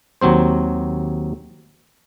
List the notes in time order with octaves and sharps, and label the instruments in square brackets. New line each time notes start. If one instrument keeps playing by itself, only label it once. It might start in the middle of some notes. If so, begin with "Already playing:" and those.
[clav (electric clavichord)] D#2 F#3 C4 C5